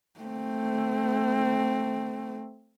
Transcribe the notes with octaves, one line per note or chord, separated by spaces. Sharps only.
A3 C4